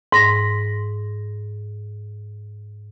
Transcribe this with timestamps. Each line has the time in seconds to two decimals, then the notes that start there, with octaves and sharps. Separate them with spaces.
0.12 G#2 A#6